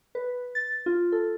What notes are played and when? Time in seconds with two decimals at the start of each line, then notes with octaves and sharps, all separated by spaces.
0.15 B4
0.55 A6
0.86 F4
1.12 A4